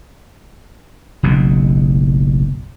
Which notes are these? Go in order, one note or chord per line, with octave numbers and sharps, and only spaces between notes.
F#1 B1 B2